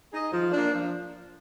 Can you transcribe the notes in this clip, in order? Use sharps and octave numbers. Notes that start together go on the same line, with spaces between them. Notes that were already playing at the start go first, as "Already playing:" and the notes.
D#4 G#4 D#5
F3
A#3 D4
F3